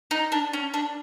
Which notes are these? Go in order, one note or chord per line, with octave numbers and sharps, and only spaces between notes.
D#4
D4
C#4
D4